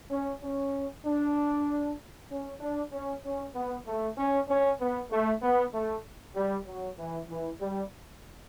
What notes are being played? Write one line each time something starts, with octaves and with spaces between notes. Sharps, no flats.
C#4
C#4
D4
C#4
D4
C#4
C#4
B3
A3
C#4
C#4
B3
A3
B3
A3
G3
F#3
E3
E3
G3